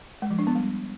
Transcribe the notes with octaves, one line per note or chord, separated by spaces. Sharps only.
G#3
F3
D4
B3
G3